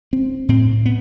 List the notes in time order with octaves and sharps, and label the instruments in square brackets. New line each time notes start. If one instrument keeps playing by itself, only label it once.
[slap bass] C4
A2 C4
B3